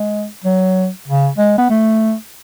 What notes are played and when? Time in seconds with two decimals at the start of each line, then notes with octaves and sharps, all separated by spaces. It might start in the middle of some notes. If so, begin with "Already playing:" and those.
Already playing: G#3
0.44 F#3
1.08 C#3
1.38 G#3
1.58 B3
1.70 A3